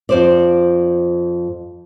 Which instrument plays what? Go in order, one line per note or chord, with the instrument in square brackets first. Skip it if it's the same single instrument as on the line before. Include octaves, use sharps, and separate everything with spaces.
[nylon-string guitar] F2 C5 D5